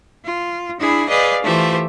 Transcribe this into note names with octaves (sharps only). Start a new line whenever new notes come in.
F4
D4 E4 G#4 B5
G#4 B4 D5 D#5 F5
E3 A3 F4 G4 C5 E5